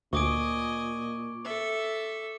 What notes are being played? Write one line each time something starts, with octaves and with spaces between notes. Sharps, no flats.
D2 A#2 D#5 G#5 C#6 D6 D7
A4 E5